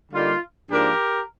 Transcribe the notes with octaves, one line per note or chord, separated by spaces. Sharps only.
D3 G3 A#3 D#4 F4
G#2 F3 A#3 D4 G4 A#4